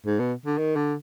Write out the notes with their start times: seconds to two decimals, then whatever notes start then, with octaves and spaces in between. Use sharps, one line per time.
0.07 G#2
0.19 B2
0.46 D3
0.58 D#3
0.76 D3